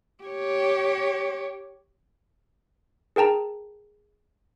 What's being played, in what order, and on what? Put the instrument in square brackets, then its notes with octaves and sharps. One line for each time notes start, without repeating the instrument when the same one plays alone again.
[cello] G4 C#5
[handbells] G#4 A#4 G5 A5 A#5